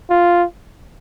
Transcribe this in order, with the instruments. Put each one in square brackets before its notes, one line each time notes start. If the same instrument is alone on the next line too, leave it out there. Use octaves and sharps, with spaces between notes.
[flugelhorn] F4